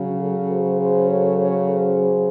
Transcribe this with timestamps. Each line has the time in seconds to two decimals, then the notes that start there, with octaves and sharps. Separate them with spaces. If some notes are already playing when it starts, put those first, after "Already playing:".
Already playing: C#3 F#3
0.19 F#4 A4
0.49 G#4 C5
0.80 G#4 C5
1.09 A4 C#5
1.39 A4 C#5
1.69 G#4 C5